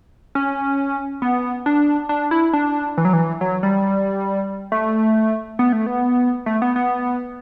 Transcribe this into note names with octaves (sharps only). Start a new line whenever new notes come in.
C#4
B3
D4
D4
E4
D4
E3
F#3
E3
F#3
G3
A3
B3
A3
B3
A3
B3
B3